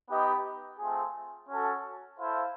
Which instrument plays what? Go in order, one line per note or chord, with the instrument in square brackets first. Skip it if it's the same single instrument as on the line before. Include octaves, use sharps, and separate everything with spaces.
[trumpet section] B3 D#4 G4 B4 D#5
A3 C4 F4 G#4
C#4 F#4 A4
E4 A4 C5 F5